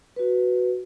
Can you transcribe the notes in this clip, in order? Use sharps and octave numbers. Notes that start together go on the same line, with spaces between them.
F#4 B4